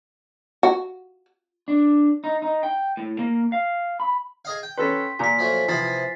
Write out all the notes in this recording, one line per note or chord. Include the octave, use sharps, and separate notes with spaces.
F#4
D4
D#4
D#4
G5
A2
A#3
F5
B5
G#4 D#5 F5
G5
C#4 A4 B4 C6 B6
A#2 F4 G#5 A#5 B6
F3 F#3 A3
C3 F3 B3 E4 A6 C7